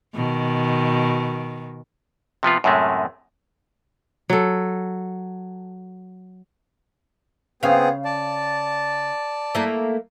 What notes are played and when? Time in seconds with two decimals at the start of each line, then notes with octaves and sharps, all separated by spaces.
0.14 B2 D#3
2.43 C3 F3 B3 F4
2.64 F#2 A2 C3 G#3 A3
4.30 F#3 A4
7.63 C#3 B3 C4 G#4 F5
8.05 D5 A5
9.55 A3 A#3 E4